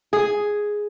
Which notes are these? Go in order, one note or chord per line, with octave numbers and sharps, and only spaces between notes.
G#4